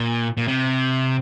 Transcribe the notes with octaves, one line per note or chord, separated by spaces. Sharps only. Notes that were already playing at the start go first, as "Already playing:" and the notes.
Already playing: A#2
A#2
C3